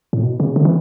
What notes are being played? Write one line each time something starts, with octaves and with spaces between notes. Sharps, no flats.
A2
B2
C#3
D3
E3